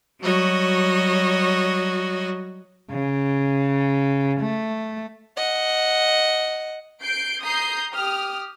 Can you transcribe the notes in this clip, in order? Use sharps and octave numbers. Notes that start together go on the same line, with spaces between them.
F#3 G3 F#4 C#5 D#5
C#3
A3
D#5 F#5
G6 C7 D7
A#5 D#6 G6 C7
G4 D#6 F6